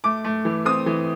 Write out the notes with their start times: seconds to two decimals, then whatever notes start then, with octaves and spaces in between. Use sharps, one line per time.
0.04 A3 D6
0.24 A3
0.45 E3
0.65 C4 D#6
0.86 E3